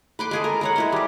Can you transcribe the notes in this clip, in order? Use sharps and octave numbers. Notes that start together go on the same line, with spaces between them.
B4 C6 D6
G#3 G#4 A4
A#4
A#4 C#5 F#5
G#3 E4 C5
G3 G4